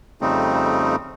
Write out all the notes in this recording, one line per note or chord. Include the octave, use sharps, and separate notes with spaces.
F2 C#3 G3 A3 C4 D#4